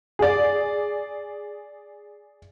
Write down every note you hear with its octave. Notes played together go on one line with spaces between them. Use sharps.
G#4 D5